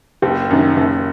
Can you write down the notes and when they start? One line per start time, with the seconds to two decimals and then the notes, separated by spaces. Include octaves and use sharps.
0.22 F#1 G4
0.50 F#2 D#3
0.77 F#1